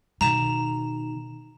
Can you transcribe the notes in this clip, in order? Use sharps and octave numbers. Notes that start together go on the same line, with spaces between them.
B2 D#3 A#5 E7